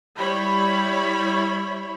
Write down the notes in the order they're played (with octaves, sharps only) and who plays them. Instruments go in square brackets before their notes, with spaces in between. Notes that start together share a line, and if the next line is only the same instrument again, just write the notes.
[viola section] G3 E4 C#5 B5